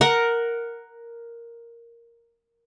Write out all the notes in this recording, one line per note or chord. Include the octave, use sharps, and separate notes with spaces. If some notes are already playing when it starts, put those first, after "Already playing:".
A#4 F#5